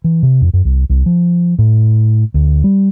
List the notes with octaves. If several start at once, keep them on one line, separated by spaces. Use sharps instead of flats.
E3
C3
F2
F#2
C2
C2
F3
A2
D2
G3